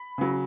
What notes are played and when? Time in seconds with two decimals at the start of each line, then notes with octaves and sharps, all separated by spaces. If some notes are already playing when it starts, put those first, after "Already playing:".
Already playing: B5
0.18 C#3 F#3